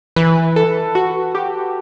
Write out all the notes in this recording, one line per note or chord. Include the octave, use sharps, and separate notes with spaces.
E3 B4
A4
F#4
G4